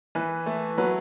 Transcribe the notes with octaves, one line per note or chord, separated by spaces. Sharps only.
E3 B4
A3
F#3 B4